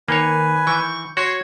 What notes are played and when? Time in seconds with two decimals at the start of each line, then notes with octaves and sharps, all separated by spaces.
0.08 D#3 A#3 B4 C#5 G#5
0.67 E3 C#6 G6
1.17 F#4 C#5 C6 G#6